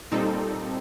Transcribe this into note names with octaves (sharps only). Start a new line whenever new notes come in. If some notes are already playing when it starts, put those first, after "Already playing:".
A#2 G3 C4 D#4 A4